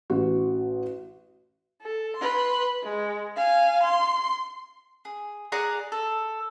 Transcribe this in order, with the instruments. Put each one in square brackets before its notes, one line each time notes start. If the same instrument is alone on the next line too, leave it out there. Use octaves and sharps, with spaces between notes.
[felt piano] A1 F#4
[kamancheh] A4
B4 C6
G#3
F5 G#5
C6
[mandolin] G#4
G#4 D5 F#5 A#5
A4